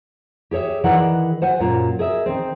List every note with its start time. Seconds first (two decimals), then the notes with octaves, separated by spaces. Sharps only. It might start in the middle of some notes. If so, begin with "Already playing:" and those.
0.51 G4 G#4 C#5 E5
0.84 D#3 E3 G#4 D5 F#5
1.42 C5 F#5 G#5
1.59 F#2 A#2 A#3
1.99 G#4 A#4 D#5 E5
2.26 D#3 C4